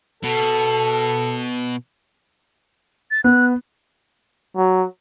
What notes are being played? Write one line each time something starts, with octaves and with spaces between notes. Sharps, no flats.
B2 A4
A6
B3 F#6
F#3